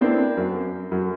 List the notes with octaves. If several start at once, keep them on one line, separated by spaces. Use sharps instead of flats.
B3 C4 D4 E4 A#4
F#2
F#2